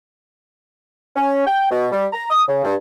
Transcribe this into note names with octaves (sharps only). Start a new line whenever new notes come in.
C#4
G5
B2
G3
A#5
D#6
C#3
G2